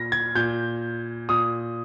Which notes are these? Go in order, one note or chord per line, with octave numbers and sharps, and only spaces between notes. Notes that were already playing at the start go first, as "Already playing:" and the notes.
Already playing: A#2 A#6
G#6
A#2 G6
A#2 D#6